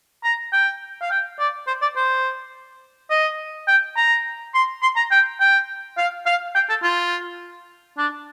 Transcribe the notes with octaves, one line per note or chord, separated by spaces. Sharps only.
A#5
G5
F5
G5
D5
C5
D5
C5
D#5
G5
A#5
C6
C6
A#5
G5
G5
F5
F5
G5
A4
F4
D4